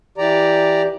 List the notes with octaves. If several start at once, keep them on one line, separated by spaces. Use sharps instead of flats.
E3 G4 D5 A#5